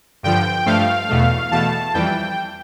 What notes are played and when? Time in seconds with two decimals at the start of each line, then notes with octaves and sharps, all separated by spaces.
0.23 G2 D3 F3 G5
0.66 G2 F3 A3 F5
1.09 E2 B2 A3
1.51 E2 B2 A3 A5
1.94 F2 E3 G3 G5